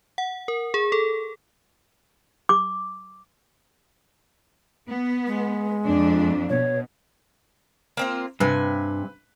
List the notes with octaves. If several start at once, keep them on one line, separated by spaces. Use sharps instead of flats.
F#5
A#4
G#4
A4
D6
B3
G#3
F2 D4
B2 C#5
A#3 C4 F4
G2 C3 B4 G#5